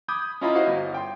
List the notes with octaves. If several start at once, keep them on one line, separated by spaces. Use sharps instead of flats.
B5 D6 D#6 G6 G#6
C#4 E4 F4 D#5 A#5 B5
E4 F#4 C5 D#5 F5
G1
G5 C6